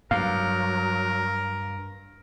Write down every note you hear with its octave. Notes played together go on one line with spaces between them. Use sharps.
G2 F#3 A#4 F5